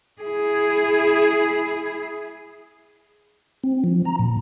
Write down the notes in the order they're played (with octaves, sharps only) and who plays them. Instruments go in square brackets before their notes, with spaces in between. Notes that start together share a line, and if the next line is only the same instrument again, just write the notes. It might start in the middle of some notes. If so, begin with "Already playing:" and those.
[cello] E4 G#4
[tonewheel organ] C4
F3
A#5
A#2